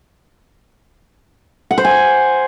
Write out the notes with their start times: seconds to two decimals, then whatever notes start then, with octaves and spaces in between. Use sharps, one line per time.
1.71 F#5
1.78 C5
1.85 G#5